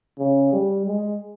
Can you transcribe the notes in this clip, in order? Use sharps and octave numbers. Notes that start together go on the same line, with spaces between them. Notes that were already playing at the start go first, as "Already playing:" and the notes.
C#3
G3
G#3